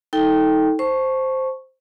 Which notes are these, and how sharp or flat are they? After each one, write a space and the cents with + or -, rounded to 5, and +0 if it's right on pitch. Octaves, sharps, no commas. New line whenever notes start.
D#4 +25 A4 +0 G5 +0
C5 +0 A5 +0 C#6 -5